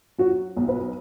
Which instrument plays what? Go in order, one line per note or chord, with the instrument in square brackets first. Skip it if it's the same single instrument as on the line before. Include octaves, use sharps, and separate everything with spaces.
[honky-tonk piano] F#3 F#4
B1
B4